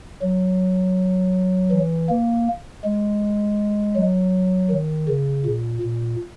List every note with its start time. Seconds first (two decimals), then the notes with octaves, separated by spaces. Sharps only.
0.22 F#3
1.71 E3
2.09 A#3
2.84 G#3
3.96 F#3
4.70 D#3
5.08 C#3
5.45 A#2
5.82 A#2